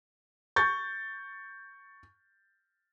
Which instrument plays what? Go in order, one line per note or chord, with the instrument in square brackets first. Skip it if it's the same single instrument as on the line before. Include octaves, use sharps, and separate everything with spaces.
[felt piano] C#6 G6 A6